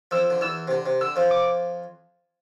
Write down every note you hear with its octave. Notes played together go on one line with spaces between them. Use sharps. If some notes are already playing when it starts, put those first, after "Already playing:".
F2 F3 E6
D3
E2 E3 E6
C3
D3
C3
D3 E6
F2 F3
D6